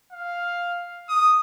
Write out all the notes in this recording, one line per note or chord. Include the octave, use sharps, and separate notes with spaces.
F5
D#6